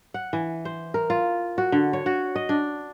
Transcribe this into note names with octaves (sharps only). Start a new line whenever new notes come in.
F#5
E3
C5
A#4
F4
F#4
D3
C#5
F#4
D#5
D4